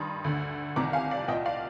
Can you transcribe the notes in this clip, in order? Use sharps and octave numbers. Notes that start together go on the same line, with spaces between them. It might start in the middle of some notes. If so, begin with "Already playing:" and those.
Already playing: G2 D#3 C6 D#6
D2 D3
C2 C3 D#3 A#5 D6
F5 G#5
D5 F5
C2 A#2 D#5 G5
D5 F5